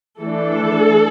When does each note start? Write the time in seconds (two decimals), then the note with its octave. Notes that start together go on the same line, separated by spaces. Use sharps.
0.20 E3 A3 D4 A4